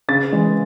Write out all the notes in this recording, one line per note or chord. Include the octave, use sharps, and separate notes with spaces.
C#3 A6
E3 G#3